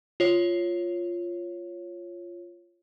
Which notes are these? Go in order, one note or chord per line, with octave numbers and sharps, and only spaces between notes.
F4 C#5